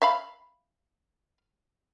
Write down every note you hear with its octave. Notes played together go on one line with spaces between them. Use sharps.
E5 F5 B5